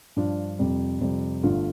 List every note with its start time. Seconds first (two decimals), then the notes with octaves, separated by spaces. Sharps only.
0.16 G2 F3 D4 F4
0.59 F2 C3 G3
1.00 F2 C3 G3
1.43 G1 G2 D3 A3 F4